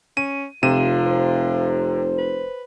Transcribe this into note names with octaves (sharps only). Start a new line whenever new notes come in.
C#4 D#7
F1 C3 F4 D#7 E7
C5
B4